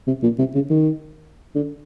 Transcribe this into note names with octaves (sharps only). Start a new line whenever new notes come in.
C3
A#2
C3
C#3
D#3
D3